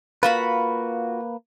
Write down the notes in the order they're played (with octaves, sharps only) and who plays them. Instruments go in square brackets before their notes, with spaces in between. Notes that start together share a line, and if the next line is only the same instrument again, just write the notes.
[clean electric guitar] A#3 B4 [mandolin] F4 F#4 B5